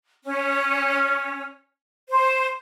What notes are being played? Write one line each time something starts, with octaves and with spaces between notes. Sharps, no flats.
C#4
C5